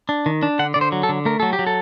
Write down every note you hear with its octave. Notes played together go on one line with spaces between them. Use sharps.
D4
D#3
D4
D3 F#5
D3 D5
C5
F#3
A4
D3
A3 A#4
F#3 A4
G4
F#3
A4